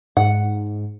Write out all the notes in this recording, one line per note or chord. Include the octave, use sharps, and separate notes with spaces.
G#2 F#5